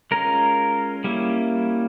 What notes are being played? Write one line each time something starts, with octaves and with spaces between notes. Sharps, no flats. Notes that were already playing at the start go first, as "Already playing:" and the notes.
G#3 C#4 F4 A#4
G3 A#3 C#4 E4